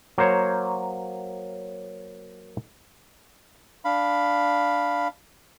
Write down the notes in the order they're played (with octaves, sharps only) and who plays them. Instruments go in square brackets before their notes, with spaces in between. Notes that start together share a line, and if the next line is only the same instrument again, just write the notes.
[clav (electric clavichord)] F#3 A#3 C5 C#5
[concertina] D4 F5 B5